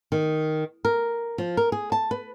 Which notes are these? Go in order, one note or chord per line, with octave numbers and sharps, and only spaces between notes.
D#3
A#4
F3
A#4
G#4
A5
B4